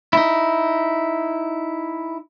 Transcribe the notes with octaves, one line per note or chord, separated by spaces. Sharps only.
D#4 E4